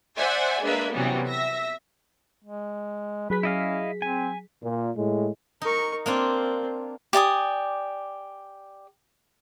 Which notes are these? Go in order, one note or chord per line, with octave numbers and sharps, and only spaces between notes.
C5 D5 E5 F#5 G#5
G#3 A#3 D4 B4 E5
C3 E3 F#3 G3 B3 C#4
E5 A#6
G#3
F#3 G#4 B4 B6
C#4 E4 D#5 F5
C4 G#5
A#2
A2 G#3
D#4 A#4 C#6
A#3 C4 D4 F4
G4 D5 G#5 D#6